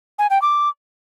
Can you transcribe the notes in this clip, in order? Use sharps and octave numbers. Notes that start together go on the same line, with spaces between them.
G#5
G5
D6